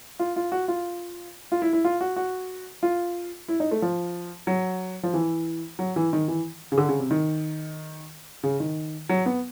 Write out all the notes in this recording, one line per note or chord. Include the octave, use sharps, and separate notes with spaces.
F4
F4
F#4
F4
F4
E4
E4
F4
F#4
F#4
F4
E4
D#4
A3
F3
F#3
F3
E3
F#3
E3
D#3
E3
C#3
D3
C#3
C3
D#3
C#3
D#3
F#3
B3